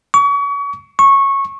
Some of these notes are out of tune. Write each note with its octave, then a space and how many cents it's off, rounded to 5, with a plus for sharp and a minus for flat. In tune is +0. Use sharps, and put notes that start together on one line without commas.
C#6 +35
C#6 -15